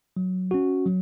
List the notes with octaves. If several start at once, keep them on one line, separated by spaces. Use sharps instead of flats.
F#3
C#4 F#4
F#3